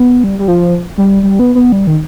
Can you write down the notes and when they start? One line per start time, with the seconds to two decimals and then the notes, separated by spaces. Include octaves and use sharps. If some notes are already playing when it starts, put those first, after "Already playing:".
Already playing: B3
0.24 G3
0.39 G3
0.48 F3
0.98 G3
1.23 G3
1.39 B3
1.55 B3
1.72 G3
1.87 D#3